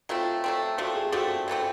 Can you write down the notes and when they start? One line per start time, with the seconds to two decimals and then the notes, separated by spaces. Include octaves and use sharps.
0.09 F#3 A3 C4 F4
0.44 F#3 A3 C4
0.78 D3 F3 A3 C4 F#4
0.96 G#4
1.12 D3 F3 A3 C4 F#4
1.48 C#3 E3 A3 C4